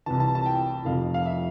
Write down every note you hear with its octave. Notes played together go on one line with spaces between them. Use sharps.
C2 C3 E3 A5
A5
A5
G5
F1 F2 C3 F3 F5
F5
E5